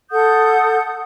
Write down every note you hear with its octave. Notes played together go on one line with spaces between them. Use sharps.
A4 F#5 D#6 G6